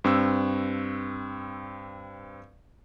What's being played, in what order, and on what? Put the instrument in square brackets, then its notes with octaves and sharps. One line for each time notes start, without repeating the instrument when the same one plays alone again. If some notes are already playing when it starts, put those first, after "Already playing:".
[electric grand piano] G2 C4 C#6 E6